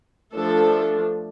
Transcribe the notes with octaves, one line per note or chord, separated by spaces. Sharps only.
F3 A3 D4 A4